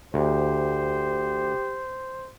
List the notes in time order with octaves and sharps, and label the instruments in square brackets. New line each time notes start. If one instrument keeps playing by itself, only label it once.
[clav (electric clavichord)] D2 [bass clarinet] G4 [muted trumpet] C5